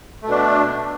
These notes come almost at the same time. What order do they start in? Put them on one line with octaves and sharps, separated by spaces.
A3 B2 D4